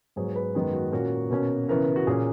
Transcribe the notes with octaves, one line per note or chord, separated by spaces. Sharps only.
G#2 F#3 B3 G#4
B4
F#2 D#3 G#3 B3 G#4
F#4
A#2 A#3 C#4 F#4
B2 A#3 C#4
C#3 E3 B3 A#4
F#4
A#2 A#3 C#4 G#4